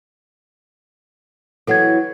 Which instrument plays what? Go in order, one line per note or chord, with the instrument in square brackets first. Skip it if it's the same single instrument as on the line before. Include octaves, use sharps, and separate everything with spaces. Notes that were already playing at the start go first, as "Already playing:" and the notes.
[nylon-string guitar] E3 F#3 B3 [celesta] A4 F#5 G#6